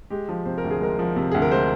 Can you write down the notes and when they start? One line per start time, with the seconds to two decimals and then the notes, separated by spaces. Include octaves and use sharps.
0.10 G#3 G4
0.29 F3
0.46 C3 C5
0.58 A#4
0.64 D2
0.71 G#4
0.81 G#3 A#4
0.99 F3
1.16 C3
1.32 D2 G#4
1.42 A#4
1.52 G#3 C5